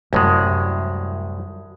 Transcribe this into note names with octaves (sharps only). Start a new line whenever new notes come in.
C2 F#2 A2 G3 G#3